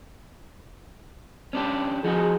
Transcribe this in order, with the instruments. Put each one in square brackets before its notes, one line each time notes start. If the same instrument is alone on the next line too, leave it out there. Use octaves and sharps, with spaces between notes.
[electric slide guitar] C#4 D4 G4
[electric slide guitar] F3 D#4 F#4 [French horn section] G#4